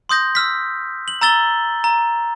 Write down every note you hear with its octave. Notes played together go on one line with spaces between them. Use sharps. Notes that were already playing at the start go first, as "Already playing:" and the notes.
C6 D#6 G6 A#6
E6 F6 B6
F#7
A#5 E6 A6 G7
A#5